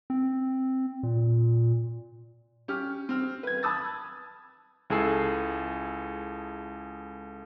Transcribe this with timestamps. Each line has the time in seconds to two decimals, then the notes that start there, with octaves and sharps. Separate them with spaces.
0.10 C4
1.03 A#2
2.68 C#4 G4 F6
3.09 C4 F6
3.43 B4 G#6
3.63 A5 B5 D#6 E6 A6
4.90 C#2 E4 G#4 A4 E6 C7